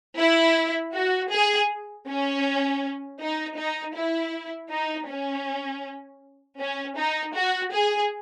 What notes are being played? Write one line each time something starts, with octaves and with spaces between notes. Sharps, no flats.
E4
F#4
G#4
C#4
D#4
D#4
E4
D#4
C#4
C#4
D#4
F#4
G#4